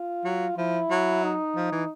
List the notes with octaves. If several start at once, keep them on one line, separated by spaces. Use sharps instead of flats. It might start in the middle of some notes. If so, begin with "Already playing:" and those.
Already playing: F4
F#3
F3 E4
F#3
D#4
F3
E3